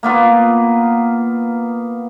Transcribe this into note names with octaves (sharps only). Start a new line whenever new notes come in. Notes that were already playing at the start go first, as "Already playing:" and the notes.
A#3 B3 F4